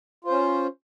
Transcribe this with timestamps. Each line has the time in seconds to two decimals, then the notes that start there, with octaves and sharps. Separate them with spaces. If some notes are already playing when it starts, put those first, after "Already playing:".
0.25 F4
0.27 C5
0.30 C#4